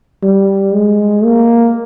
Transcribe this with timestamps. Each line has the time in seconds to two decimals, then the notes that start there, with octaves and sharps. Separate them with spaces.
0.23 G3
0.74 G#3
1.25 A#3